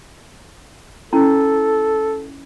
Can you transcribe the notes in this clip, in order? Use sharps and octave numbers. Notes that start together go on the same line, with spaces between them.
C#4 E4 A4